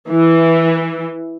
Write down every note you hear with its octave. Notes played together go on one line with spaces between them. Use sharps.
E3